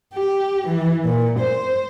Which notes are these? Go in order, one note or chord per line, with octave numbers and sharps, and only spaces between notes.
G4
E3
A#2
C5